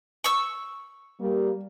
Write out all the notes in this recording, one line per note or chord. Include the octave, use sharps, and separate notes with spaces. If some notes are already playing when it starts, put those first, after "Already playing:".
C#6 E6
G3 A#3